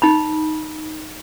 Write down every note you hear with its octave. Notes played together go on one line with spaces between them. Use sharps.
D#4 B5